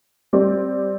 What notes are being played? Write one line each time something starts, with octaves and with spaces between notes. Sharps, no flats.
G3 C4 G4 D5